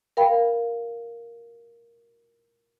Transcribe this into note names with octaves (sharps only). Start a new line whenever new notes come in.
A#4 F5 G5 B5